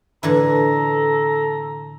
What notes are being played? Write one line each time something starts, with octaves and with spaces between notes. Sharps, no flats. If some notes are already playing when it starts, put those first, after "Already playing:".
A2 D3 E3 A4 A#5